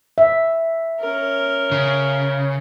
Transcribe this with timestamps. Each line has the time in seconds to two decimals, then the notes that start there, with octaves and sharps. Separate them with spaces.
0.18 E5
1.00 C#4 A#4
1.71 C#3